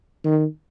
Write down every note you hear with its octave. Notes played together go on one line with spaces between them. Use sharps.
D#3